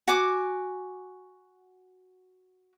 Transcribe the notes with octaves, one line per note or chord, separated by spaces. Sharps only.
F#4 G#5 D6